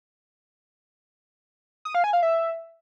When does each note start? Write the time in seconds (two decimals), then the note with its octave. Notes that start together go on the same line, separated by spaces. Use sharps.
1.85 D#6
1.95 F5
2.04 G#5
2.13 F5
2.23 E5